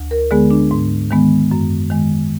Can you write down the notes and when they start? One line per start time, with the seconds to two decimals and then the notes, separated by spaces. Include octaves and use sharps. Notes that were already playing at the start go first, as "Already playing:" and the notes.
Already playing: D2
0.11 A#4
0.31 D3 G#3 B3 G#4
0.51 D4
0.71 G#2
1.11 D#3 G#3 B3
1.51 F#2
1.90 D#3 G#3